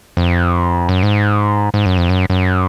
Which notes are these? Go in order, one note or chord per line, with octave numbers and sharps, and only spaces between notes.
F2
F#2
G#2
G#2
F#2
F2
F#2
F#2